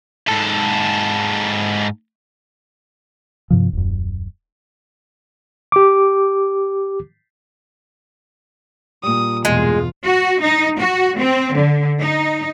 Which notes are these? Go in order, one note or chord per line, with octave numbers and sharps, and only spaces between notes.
G#2 A4
G2 C3 F3
D#1 F#2
G4 D6
A#2 G3 D#6
E2 G2 B2 G#3 F4
F#4
D#4
F#4
C4
D3
D#4